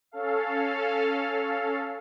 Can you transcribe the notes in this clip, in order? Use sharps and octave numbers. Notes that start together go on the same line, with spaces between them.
C#4 A4 F5